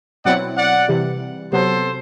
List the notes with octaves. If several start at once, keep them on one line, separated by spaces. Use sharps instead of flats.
B2 F#3 C4 E4 D5 F#5
D5 F#5
C3 E3 G3
C3 F#3 B3 A4 C5